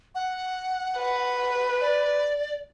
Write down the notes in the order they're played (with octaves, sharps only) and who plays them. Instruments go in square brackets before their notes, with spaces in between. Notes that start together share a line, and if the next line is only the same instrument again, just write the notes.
[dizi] F#5
[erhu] B4
[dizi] D5